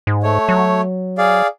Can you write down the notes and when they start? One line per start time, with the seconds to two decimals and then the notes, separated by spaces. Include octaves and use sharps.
0.07 G#2
0.23 A3 C#5
0.49 F#3
1.18 G#4 D5 F5